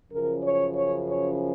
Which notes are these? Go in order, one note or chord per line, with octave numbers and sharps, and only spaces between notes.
F#2 C#3 F3 A#4
C#5
C#5
C#5